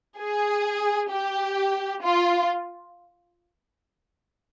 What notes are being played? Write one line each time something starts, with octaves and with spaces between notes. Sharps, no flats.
G#4
G4
F4